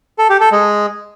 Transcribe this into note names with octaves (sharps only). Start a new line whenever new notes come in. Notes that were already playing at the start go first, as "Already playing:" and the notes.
A4
G4
A4
G#3